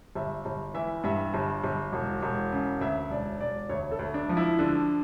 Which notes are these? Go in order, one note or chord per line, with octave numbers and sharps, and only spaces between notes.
G1 E5
G1
E3 E5
G2 E5
G1
G1
E1
E1
C#3
D2 E5
E1 D5
E1 D5
D2 C#5
A4
D2
D4
F3
E4
D3 D4